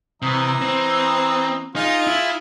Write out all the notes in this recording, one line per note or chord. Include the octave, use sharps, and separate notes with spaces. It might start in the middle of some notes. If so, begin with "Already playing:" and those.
C3 E3 D#5 A#5
C4
D#4 F4 G#4
E4